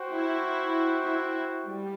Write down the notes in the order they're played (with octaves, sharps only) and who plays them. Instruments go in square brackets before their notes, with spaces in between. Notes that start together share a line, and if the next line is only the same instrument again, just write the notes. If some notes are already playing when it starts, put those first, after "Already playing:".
Already playing: [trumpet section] F#4 C5 G5
[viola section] E4
E4
G3